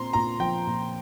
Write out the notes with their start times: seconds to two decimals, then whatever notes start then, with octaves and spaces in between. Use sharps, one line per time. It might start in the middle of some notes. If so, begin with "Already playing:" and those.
Already playing: A#2 C4 A#5 C6
0.13 A#2 A#5
0.39 F3 G5
0.66 A#2